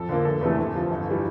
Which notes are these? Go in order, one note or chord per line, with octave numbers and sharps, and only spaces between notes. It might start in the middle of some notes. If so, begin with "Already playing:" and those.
Already playing: F2 A4
D3 F3 A#3
F1 A4
E2 C3 E3 A3
D2
C3 F3
G1
E3 G3